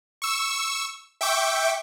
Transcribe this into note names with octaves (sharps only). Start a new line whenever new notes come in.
C#6 E6
E5 G5 C#6 D6